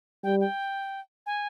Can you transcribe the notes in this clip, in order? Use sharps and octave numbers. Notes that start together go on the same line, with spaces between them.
G3 G5
G5
G#5